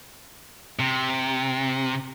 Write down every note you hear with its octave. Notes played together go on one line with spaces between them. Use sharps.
C3